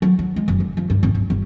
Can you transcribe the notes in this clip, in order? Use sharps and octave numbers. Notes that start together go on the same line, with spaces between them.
F#3
F#3
G#3
F#1
D3
F3
G2
G#1
D1
G1